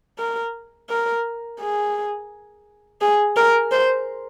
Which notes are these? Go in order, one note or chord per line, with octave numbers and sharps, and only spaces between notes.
A#4
A#4
G#4
G#4
A#4
C5